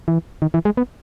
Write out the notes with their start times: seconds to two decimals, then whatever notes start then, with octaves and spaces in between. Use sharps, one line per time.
0.08 E3
0.42 D#3
0.54 E3
0.65 G#3
0.77 B3